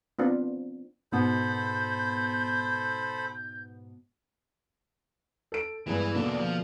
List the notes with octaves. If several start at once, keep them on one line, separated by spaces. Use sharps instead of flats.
B3 C4 D4 F4
G#2 B2 B3 A4 C5 B5 G6
A4 D7
G2 E3 G#3 B3
E2 B2 D3 A#3 D4
F3